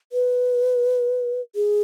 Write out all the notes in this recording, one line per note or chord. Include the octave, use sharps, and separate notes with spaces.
B4
G#4